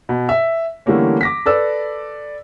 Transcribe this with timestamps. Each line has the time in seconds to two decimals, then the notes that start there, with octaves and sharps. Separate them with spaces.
0.09 B2
0.29 E5
0.86 D3 E3 G3 A3 A#3 C#4
1.21 D6 A#6 B6
1.46 A4 B4 D5 E6